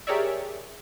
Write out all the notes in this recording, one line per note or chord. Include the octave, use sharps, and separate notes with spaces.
G4 G#4 A#4 C#5 D5 E5